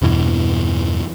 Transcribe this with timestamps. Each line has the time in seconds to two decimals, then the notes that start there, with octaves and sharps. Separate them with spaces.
0.02 E2 G2 B2 E3